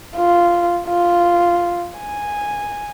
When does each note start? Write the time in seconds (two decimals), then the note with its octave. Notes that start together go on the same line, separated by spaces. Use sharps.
0.16 F4
0.87 F4
1.99 G#5